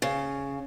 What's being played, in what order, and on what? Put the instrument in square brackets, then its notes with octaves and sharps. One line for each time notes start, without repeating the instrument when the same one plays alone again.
[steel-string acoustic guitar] C#3